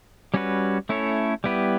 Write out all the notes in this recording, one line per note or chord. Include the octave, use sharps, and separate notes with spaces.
G3 C#4 F#4 B4
A3 C#4 E4 A4 C#5
G3 B3 E4 G4 B4